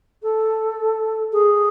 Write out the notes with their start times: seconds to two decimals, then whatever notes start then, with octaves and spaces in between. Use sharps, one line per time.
0.22 A4
1.32 G#4